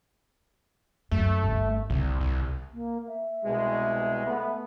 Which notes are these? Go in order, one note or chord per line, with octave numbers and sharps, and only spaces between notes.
F#2 A3
G1 G2
C2 C3
C2
A#3
E5
C2 B2 G#3
A3 B3